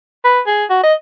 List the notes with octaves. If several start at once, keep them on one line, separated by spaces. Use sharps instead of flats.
B4
G#4
F#4
D#5